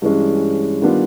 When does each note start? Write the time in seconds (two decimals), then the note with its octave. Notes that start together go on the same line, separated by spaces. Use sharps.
0.02 G2 E3 G#3 C#4
0.82 D#3 G3 B3 D4 F4